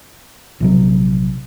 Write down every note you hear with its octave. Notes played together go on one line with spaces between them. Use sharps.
A#1 C3 F#3